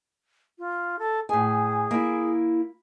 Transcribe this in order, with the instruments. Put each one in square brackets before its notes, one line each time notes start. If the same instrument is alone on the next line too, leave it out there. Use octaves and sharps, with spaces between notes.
[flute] F4
A4
[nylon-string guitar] A2 G#5 [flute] G#4
[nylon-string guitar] A#3 E4